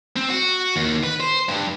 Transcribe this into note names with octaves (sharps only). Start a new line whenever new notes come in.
C4
F#4
D#2
B4
C5
G2